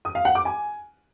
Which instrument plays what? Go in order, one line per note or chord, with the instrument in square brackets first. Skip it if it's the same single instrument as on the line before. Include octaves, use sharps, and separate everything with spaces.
[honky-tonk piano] D#6
F5
F#5
D6
G#5